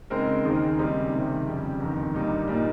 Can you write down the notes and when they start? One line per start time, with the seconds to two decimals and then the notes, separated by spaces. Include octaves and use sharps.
0.10 C#3 G#3 C4 D#4 A#4
0.44 D#2 D#3 A#3 D#4 G#4
0.79 C#3 G3 C4 D#4 G#4
1.12 C3 D#3 G3
1.47 F2 C#3 G3
1.80 G1 F2 D#3
2.14 G1 G2 G3 A#3 D#4
2.48 A#2 G3 A#3 D#4